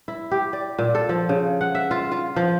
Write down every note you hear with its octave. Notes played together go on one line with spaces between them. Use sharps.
E4
G4
D5
A#2
A4
F3
C#3
F#5
E5
F4
F4
F3